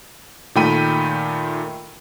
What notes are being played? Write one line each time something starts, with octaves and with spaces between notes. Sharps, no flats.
A#2 D#3 A3 G5 B5 D#7